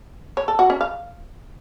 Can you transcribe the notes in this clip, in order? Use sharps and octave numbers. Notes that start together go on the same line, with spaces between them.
C#5
A4
F#4
C#4
F5